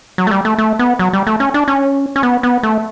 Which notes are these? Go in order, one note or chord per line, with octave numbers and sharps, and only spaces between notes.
F#3
A3
G3
A3
A3
B3
F#3
G3
A3
C#4
D4
C#4
C#4
B3
B3
A3